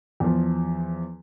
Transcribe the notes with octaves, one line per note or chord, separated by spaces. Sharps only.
E2 F3